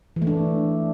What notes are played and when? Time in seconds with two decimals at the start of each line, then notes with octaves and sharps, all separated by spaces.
0.16 E3
0.22 A3
0.27 D4